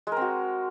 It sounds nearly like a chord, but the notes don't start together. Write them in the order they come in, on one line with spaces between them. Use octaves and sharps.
G#3 A#4 C4 F#4